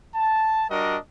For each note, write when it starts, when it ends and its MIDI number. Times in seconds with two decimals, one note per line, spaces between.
0.14 0.64 81
0.69 0.96 55
0.69 0.96 62
0.69 0.96 66
0.69 0.96 70
0.69 0.96 75